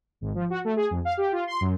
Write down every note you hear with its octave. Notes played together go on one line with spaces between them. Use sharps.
G#1
F3
F#4
A3
G#4
F2
F5
G4
F4
C6
F#2